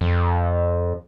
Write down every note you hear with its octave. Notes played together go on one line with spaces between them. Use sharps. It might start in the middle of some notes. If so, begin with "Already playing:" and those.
F2